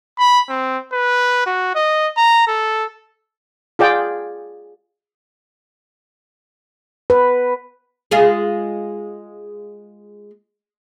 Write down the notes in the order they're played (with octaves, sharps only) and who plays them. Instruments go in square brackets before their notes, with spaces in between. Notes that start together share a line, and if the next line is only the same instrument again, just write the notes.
[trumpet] B5
C4
B4
F#4
D#5
A#5
A4
[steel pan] F4 G#4 D5 G5
[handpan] B4
[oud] G#3 F4 G#4